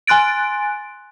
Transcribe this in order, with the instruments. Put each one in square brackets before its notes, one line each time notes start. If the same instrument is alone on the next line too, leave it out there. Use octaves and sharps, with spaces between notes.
[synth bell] G#5 C6 F#6 A6 D7